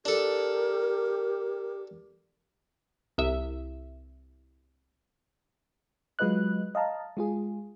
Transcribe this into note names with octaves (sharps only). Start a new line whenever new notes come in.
D4 G4 A4 A#4
C2 E5
F#3 G#3 F4 B4 D#5 F#6
D#5 F5 A5 A#5
G#3 F4 G#4